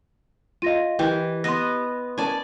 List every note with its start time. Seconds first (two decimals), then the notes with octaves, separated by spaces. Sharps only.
0.62 F4 D#5 F5 A#6 D#7
0.99 E3 G4 A#4
1.44 B3 D#5 C6 A#6
2.18 C#4 A#4 D5 G#5 A5